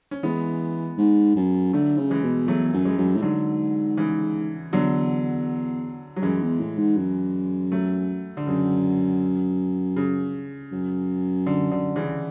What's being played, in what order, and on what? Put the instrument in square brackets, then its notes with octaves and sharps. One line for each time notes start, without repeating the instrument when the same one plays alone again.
[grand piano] C#4
[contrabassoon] E3 [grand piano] G#3 B3
[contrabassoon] G#2
F#2
[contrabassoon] D3 [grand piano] F#3 A3
[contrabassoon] C#3
[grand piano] E3 G#3
[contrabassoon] B2
[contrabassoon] E2 [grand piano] F#3 A3
[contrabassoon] F#2
[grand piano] E3 G#3
[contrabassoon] F#2
A2
[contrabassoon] G#2 [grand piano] D3 F#3
[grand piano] C#3 E3
[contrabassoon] E2 [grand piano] D3 F#3
[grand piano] F#3
[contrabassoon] F#2 [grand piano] E3 G#3
[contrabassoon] E2
A2
G#2
F#2
[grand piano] F#3 A3
D3
[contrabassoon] F#2 [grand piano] C#3
[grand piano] C#3
[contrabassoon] F#2
[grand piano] D3
D3
C#3 E3